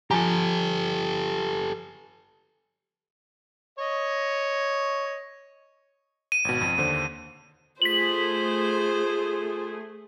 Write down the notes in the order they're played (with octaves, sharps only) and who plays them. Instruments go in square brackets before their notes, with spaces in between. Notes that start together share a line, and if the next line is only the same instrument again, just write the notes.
[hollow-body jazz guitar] F3 G#5 A#5 [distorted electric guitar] G4 A4
[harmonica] C#5 D#5
[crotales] D#7
[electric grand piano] G#1 B2
F2
D#2 D3 C5
[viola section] A3 G#4 [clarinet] F4 [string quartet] C5 [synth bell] B6 F#7